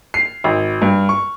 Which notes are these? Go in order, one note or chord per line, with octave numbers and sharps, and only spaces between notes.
C7
G#1
G2
C#6